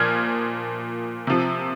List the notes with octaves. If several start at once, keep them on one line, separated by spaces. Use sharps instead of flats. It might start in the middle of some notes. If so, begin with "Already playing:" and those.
Already playing: A#2 F3 F6 G#6
C3 F3